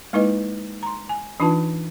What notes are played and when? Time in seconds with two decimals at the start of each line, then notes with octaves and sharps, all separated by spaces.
0.13 G#3 A#3 D#4 E4 B4 D#5
0.83 A#5 C6
1.09 G#5
1.40 E3 D4 D#4 F4 B4 A5